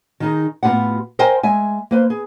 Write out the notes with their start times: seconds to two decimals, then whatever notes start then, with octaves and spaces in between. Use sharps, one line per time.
0.20 D#3 D#4 G#4
0.63 A2 B3 D#4 F4 G4 F#5
1.19 A#4 C5 D#5 G5 G#5
1.43 G#3 E5 G#5
1.91 A#3 B4 C5
2.10 G#4